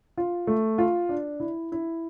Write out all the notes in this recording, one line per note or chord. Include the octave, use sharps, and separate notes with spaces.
F4
A3
F4
D4
E4
E4